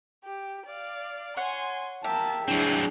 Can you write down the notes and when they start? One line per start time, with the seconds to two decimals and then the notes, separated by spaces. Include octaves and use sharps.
0.25 G4
0.66 D5 F5
1.37 C#5 F#5 G#5 C6
2.04 A#3 G4 E5 A5
2.48 F#3 C4 D4 E4 G#4 G#5